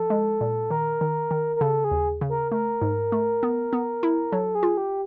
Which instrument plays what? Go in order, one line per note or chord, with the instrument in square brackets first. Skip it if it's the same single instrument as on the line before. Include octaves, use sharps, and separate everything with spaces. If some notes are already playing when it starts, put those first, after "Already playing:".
Already playing: [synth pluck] F3 [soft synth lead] A4
[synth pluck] G#3
A#2
[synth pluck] D#3 [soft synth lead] A#4
[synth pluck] D#3
D#3
[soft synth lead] A#4
[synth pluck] C#3 [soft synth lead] A4
[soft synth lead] G#4
[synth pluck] D#2
C#3
[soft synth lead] A#4
[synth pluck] A3 [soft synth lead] A#4
[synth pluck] G#2
A3
B3
B3
E4
[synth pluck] F#3 [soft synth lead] A4
[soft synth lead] G#4
[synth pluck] F4
[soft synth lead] G4